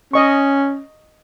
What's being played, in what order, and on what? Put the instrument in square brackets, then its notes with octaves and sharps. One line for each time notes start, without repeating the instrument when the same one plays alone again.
[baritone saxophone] C#4 [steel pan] D#5 C#6